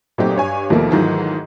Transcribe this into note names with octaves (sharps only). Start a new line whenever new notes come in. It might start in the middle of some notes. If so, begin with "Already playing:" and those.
A#2 F#3 A3 C4 D#4 G4
G2 C#5 G#5
D#2 B2 F3 A3 A#3
G#2 D#3 E3 F#3 A3 F4